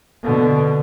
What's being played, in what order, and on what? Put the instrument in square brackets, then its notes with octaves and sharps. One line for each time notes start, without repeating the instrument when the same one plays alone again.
[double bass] B2 D3